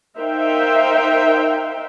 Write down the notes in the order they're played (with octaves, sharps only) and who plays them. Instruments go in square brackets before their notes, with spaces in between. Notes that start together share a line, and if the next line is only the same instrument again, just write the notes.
[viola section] D#4 A#4 C5 E5 F5 G5